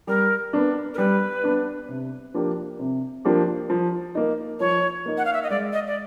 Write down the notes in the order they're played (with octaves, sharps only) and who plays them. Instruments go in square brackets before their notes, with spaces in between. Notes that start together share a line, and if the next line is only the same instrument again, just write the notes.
[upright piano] G3 [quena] A#4
[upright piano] B3 D4
[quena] A#4
[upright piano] G3 [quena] B4
[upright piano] B3 D4
C3
F3 A#3 D4 G4
C3
F3 A#3 D4 G4
F3
A#3 D#4
[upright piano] F3 [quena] C#5
[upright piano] A#3 D#4
[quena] F#5
F5
E5
D#5
[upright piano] G#3 [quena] D5
[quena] D#5
D5